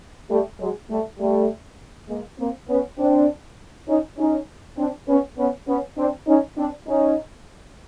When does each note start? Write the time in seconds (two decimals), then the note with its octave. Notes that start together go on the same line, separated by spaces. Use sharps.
0.30 G3 A3
0.60 F#3 G#3
0.90 G3 A3
1.20 G3 A3
2.09 G#3 A#3
2.39 A#3 C4
2.69 B3 C#4
2.99 C4 D4
3.88 C#4 D#4
4.18 C#4 D#4
4.78 C4 D4
5.08 B3 C#4
5.38 B3 C#4
5.68 B3 C#4
5.97 C4 D4
6.27 C#4 D#4
6.57 C4 D4
6.87 C#4 D#4